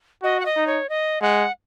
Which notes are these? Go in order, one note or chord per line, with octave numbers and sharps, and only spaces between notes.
F#4 D#5
F#5
D#5
D#4
C#5
D#5
G#3 F#5